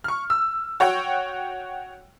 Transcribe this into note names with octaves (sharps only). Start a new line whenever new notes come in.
C#6 F6
E6
F#4 C#5 F#5 G5